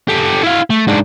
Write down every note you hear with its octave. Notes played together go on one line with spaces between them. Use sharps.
G4 A4
E4 F5
A3
G#2 D4